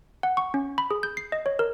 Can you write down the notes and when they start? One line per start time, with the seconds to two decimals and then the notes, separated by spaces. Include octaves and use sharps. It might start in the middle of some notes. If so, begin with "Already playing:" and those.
0.23 F#5
0.37 C#6
0.54 C#4
0.78 B5
0.91 G#4
1.03 G6
1.17 C7
1.32 D#5
1.46 C#5
1.59 A#4